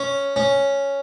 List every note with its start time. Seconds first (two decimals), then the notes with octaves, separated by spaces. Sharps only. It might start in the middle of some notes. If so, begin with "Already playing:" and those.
Already playing: C#4
0.36 C#4